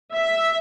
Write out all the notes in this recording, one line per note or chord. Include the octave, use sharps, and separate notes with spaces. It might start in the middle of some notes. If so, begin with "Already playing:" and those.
E5